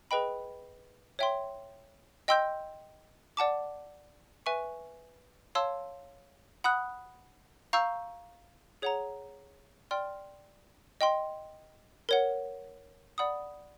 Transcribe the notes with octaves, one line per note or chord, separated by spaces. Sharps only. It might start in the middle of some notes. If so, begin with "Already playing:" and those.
G#4 B4 D#5 G5 B5
C#5 E5 G5 C6
D#5 G5 C6 E6 G6
D5 F#5 A5 D6
B4 E5 G#5 C#6
C#5 F5 A5 C6 E6
F#5 B5 D#6 F#6
F5 A#5 C#6 E6 G6
G#4 C#5 F#5 A#5
D5 G5 C6 F6
D#5 G5 C6
A#4 C#5 F#5
D5 F#5 B5 D#6